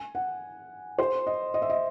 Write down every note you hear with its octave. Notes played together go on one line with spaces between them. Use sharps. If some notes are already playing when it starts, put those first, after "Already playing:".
Already playing: G#5
F#5
C5
D#5
D#5
E5
D#5